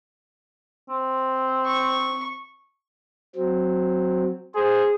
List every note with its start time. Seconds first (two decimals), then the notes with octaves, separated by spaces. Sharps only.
0.88 C4
1.65 C#6
3.36 F#3 C4
4.55 G#4 C5